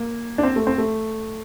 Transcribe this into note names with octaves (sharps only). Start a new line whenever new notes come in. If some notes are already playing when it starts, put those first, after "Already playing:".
Already playing: A#3
D4
C4
A3
C4
A3